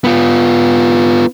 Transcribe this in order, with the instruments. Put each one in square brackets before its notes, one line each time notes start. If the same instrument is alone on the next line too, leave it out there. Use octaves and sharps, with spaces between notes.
[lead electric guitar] B3 F4